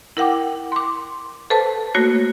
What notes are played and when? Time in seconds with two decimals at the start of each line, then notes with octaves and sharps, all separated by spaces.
0.17 E4 A#4 F#5 G5 D6
0.72 C6 D6
1.50 A4 B4 C5 A5
1.94 A3 A#3 F#4 C#5 A#6